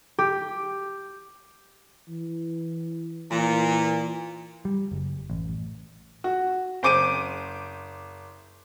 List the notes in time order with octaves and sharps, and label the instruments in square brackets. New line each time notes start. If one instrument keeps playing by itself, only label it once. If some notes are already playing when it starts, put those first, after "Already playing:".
[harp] G4
[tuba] E3
[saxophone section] A#2 [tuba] E3
[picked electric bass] G3
F#1
A1
[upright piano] F#4
F#1 C5 D6 D7 D#7